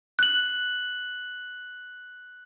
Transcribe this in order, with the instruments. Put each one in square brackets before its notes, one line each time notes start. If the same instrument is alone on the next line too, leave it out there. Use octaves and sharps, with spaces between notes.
[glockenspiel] F#6 F#7